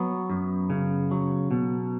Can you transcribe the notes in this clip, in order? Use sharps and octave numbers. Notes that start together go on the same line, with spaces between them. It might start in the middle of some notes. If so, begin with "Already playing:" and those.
Already playing: F#3 B3
F#2
C#3
F#3
B2